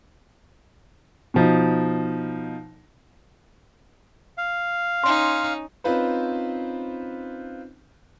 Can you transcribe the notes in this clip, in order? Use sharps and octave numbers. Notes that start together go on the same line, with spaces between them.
B2 F3 D#4
F5
C#4 D#4 C6
C4 C#4 D#4 F4 B4 C5